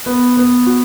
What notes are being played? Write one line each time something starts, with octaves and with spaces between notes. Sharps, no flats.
B3
B3
F#4